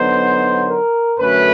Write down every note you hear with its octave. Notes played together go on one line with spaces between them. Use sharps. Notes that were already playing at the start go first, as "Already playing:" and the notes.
Already playing: D3 F#3 B3 D#4 C5
A#4
F#2 D3 F#3 A3 C#4 B4